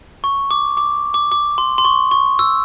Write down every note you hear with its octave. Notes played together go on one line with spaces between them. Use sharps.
C#6
D6
D6
D6
D6
C6
C6
C#6
C#6
E6